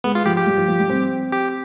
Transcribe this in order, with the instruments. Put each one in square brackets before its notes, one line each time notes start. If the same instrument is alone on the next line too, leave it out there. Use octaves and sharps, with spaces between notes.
[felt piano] G#3 [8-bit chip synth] B3
[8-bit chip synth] F4
[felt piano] F3 [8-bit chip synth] G4
[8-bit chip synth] G4
[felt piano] G3
F3
F3
G3
C4
[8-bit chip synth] G4